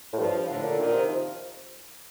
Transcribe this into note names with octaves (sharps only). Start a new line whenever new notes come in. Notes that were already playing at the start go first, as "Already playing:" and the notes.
A2
G2 F3
A2 D3
A#2
A#2 D#3
C3
F3